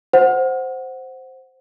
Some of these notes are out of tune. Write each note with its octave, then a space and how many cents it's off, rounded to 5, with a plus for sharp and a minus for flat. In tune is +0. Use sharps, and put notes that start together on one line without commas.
C5 +0 F#5 +0